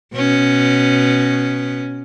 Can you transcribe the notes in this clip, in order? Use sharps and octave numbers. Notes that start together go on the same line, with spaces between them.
B2 C#4